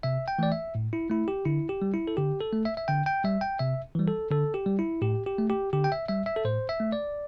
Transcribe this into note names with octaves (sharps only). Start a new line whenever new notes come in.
C3 E5
G5
E3 A3 D5
E5
A2
E4
A3 E4
G4
D3 E4
G4
G3
E4
A4
D3 G4
A4
A3
E5
E5
D3 G5
G5
G3 E5
G5
C3 E5
E3 G3
A4
D3 A4
G4
G3
E4
A2 G4
G4
A3
G4
D3 G4
G5
E5
G3 E5
E5
A4
A2 C5
E5
A3
D5